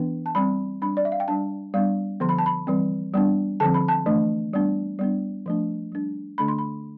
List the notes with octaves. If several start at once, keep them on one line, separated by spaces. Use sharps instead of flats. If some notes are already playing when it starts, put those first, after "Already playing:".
Already playing: E3 B3 D4
A5
G3 C4 B5
G3 D4 B5
D5
E5
F5
G5
G3 D4 A5
G3 B3 D4 F5
D3 F3 B3 C6
B5
A5
B5
E3 G3 C4
G3 B3 D4
D3 F3 C4 A5
B5
A5
E3 A3 D4
G3 B3 D4
G3 B3 D4
F3 A3 D4
G3 D4
D3 A3 D4 B5
C6
B5